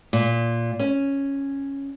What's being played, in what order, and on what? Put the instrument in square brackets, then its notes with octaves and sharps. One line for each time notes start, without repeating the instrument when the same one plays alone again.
[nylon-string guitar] A#2
C#4